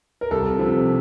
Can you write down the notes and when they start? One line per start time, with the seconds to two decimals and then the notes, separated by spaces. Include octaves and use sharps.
0.21 A#4
0.31 C2 A4
0.59 C3 F3